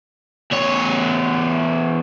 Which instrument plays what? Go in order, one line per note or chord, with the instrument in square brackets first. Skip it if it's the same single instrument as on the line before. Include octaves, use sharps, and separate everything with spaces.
[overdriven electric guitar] E2 C#5